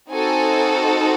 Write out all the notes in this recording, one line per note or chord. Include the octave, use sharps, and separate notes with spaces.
C4 D#4 F#4 A4 G#5